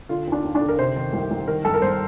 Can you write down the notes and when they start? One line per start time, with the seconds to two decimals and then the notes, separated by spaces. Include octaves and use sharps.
0.09 D3 F4
0.27 D#2
0.32 D4
0.44 D#2
0.55 D4
0.61 D3
0.69 A#4
0.78 C3 C5
0.96 D#3
1.13 C2
1.31 C2
1.48 D#3 A#4
1.64 G2 A4
1.74 A#4
1.82 G2 C5